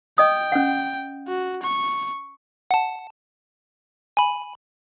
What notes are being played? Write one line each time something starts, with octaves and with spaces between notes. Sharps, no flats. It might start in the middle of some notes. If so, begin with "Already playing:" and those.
D#5 G5 D#6
C#4 F#5
F#4
C#6
F#5 A5
G#5 B5